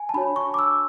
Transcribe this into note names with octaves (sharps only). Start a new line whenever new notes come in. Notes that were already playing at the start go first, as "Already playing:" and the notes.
Already playing: G#5
A5
D4 F#4 C#5 B5
C#6
D6
E6